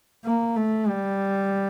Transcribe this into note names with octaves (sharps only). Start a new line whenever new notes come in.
A#3
A3
G3